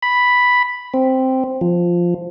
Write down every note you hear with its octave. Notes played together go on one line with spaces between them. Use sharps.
B5
C4
F3